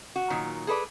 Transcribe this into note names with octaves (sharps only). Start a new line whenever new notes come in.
F#4
A#2 D#3 F#3
G#4 A4 B4 D5